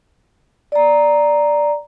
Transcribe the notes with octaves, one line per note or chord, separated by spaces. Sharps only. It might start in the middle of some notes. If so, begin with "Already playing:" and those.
D5 A#5